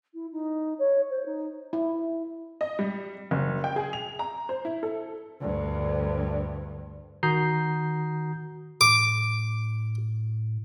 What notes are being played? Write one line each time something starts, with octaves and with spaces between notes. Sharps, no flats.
E4
D#4
C#5
C5
D#4
E4
D#5
G3
F#1
G5
G#4
F7
A#5
C5
E4
A4
D2 G2
D#3 F#4 A#5 D#6 G6 C7
A2 D6